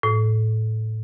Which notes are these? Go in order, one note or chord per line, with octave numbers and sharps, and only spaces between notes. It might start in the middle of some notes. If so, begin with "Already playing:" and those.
A2